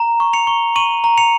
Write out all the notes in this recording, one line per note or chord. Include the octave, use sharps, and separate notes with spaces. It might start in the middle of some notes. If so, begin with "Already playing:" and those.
Already playing: A#5
C#6
C#7 F7
C#6
C#6 D#7 F#7
A#5
C#7 F7